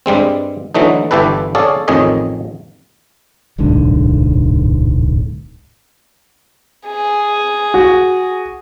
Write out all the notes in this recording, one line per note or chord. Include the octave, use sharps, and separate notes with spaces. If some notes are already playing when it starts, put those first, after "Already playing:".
G2 G3 G#3 C4
D3 E3 F#3 A3 D#4
G1 E3 G4 A4 B4
G#4 A4 C#5 D5 F5
A1 F2 D#3 G#4 C#5 D#5
D1 B1 G#2 D3
G#4
F#4